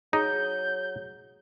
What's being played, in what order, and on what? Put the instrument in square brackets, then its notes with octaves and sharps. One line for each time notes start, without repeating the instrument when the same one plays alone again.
[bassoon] F#3 [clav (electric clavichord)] D#4 [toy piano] G#4 [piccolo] G6